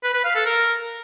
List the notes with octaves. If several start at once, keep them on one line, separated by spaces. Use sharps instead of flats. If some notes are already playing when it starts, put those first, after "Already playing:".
B4
B4
F5
A4
A#4